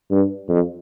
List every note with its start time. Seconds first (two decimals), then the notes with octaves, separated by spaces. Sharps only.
0.11 G2
0.49 F2